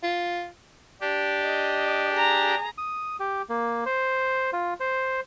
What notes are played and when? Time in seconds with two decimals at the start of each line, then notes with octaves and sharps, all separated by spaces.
0.03 F4
1.01 D4 G4
1.42 D#5
2.14 G#4 A#5
2.78 D#6
3.20 G4
3.49 A#3
3.86 C5
4.53 F4
4.80 C5